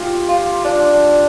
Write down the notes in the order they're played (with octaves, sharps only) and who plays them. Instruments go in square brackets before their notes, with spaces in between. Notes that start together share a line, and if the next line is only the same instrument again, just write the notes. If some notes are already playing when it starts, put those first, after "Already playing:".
Already playing: [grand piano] F4 G4
[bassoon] F4
D4